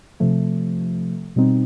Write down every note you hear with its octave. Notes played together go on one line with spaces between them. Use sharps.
C3 F3 A3
B2 G3 C4 D#4